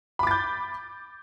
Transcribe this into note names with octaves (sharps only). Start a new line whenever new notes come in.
B5 D6 G6 A6